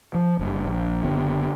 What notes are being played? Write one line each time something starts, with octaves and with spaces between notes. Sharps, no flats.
F3
F#1 G2
A#1
F#1 D3 B3